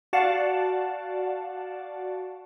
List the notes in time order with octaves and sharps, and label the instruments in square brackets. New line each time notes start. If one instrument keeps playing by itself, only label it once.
[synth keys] F#4 D5 F5 F#5 A5